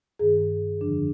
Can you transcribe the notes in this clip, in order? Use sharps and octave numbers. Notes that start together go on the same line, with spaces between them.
G2 D#3 G#4
F2 D3 F3 D4